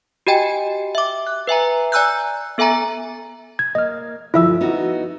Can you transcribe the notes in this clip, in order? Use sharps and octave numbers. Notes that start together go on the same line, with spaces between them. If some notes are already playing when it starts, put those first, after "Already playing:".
F#4 G4 D#5 G5 G#5
E5 D6
F#6
B4 E5 G#5 A#5
D5 G#5 A#5 E6 F#6 G6
B3 A4 E5 G#5 A#5
G#6
A#3 D#5 F6
D2 G2 F3 E4 E5 E6
B3 D#4 F#4